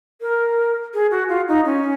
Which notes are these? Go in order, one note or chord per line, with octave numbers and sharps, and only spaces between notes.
A#4
G#4
F#4
F4
D#4
C#4